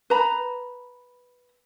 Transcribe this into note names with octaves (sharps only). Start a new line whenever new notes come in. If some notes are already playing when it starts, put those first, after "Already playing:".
B4 A#5 B5